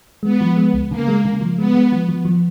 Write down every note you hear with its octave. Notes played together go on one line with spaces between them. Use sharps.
G#3 B3
F3
G#3
C#2
C#3 A#3
G#3
C#3
F3
G#3 B3
G#3
F3
F3
F3